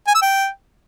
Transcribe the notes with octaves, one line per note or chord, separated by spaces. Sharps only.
G#5
E6
G5